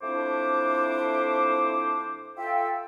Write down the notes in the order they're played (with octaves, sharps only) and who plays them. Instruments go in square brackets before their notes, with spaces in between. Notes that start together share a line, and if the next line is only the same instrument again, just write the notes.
[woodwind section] F2 A3 D4 E4 C5 D6
F4 A4 E5 G5